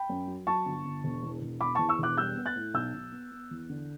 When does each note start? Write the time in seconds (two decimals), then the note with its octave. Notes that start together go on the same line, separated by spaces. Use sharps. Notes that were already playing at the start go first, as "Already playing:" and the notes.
Already playing: G5 B5
0.09 F#2
0.27 F#3
0.47 F#3 A5 C#6
0.66 G1
0.85 G1
1.04 E1
1.23 E2
1.41 E1
1.61 E2 B5 D6
1.75 E2 A5 C#6
1.89 C#6 E6
1.99 E1 D6 F#6
2.17 G3 E6 G6
2.36 B3
2.46 F#6 A6
2.56 A2
2.74 B1 E6 G6
2.94 B1
3.12 B3
3.31 B3
3.51 E2
3.69 D3